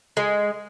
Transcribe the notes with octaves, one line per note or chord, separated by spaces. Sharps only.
G#3